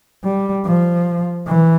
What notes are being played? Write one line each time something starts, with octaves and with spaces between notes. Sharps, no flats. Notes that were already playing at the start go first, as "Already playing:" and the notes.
G3
F3
E3